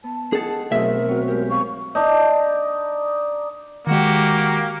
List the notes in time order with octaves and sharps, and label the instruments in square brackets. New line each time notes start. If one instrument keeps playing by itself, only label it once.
[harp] B3 [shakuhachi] A5
[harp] D#3 F#5 [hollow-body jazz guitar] G#4 A4
[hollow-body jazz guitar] B1 E5 [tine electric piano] F#3 G#4 [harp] A3 C4 D#5 [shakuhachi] A#4
[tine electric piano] C4 F#4 [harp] C#5 F5
[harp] G#3 G4 [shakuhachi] A#4
[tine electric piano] C4 F5 [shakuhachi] C#6
[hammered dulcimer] D4 D#4
[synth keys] D#3 G#3 [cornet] A#3 [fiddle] F#4 G4